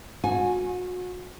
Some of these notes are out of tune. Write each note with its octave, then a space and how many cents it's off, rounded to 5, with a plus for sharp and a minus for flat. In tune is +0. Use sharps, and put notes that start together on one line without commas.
F#4 -35 G#5 +0